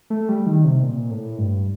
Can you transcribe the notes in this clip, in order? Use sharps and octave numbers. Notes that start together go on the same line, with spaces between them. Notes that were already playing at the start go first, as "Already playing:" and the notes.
A3
G3
D#3
C3
A#2
A2
G2